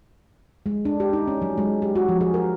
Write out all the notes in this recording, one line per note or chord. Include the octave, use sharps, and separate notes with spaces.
G#3
D4
G4
D#4
C#4
F#3
G#3
G4
F#4
F3
G#4
A#4